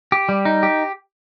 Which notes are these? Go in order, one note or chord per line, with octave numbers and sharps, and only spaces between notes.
G4
G3
D#4
G4